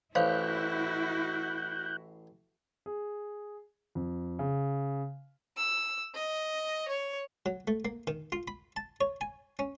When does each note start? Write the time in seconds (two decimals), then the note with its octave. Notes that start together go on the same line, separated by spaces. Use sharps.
0.15 A1 E4 F#4 C5 C#5 F5 F#6 G6
2.86 G#4
3.95 F2
4.39 C#3
5.57 E6
6.15 D#5
6.88 C#5
7.46 F#3
7.68 A3
7.85 A#3
8.07 D#3
8.32 F4
8.48 B5
8.76 A5
9.01 C#5
9.21 G#5
9.59 C#4